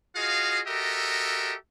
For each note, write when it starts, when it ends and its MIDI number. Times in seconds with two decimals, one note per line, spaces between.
0.16 0.60 65
0.16 0.60 66
0.16 0.60 68
0.16 0.60 75
0.16 0.60 77
0.67 1.54 66
0.67 1.54 67
0.67 1.54 69
0.67 1.54 70
0.67 1.54 75
0.67 1.54 76